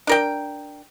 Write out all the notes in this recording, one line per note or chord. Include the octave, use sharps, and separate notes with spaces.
D4 A#4 G5